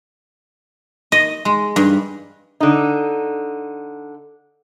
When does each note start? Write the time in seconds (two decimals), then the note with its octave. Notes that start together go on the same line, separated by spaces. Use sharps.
1.12 D#5
1.45 G#3
1.76 G2
2.60 D3 D#4